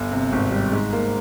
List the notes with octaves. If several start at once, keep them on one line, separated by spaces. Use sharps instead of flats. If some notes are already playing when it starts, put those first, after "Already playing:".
Already playing: G1
C3
G#1
G3
G#2
A#3